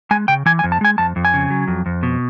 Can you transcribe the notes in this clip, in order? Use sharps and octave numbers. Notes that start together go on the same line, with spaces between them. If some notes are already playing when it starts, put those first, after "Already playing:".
G#3 G#5
C#3 G5
E3 G#5
G#5
F2
A5
G#3 G#5
F2 A5
F2
G#5
C#3
F#3
F2
F2
B2